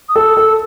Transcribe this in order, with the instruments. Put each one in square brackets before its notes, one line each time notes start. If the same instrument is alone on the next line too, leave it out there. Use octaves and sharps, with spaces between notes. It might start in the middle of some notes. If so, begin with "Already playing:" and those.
[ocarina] D#6
[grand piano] A4 [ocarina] E6
[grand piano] A4